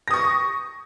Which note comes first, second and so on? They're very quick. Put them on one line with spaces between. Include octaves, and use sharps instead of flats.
A#6 D#6 C#6